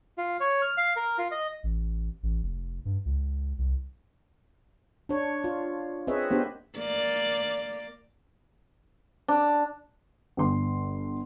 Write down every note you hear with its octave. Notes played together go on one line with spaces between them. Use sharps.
F4
C#5
F6
F5
A#4
F4
D#5
A1
A1
F1
G2
C#2
C2
D4 C#5
F4
C4 G#4 B4 C#5 D#5 E5
A#3 B3 D4 G4 C5
A#3 D5
D4
G1 C6